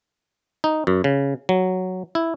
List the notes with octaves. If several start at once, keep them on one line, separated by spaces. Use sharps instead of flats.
D#4
F#2
C#3
F#3
E4